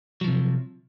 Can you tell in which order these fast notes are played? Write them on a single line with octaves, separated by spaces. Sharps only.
F#3 F3 C3